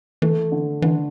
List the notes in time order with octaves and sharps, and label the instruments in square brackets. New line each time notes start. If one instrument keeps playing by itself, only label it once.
[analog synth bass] E3 [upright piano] A3
[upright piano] D3
[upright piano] D3 [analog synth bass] E3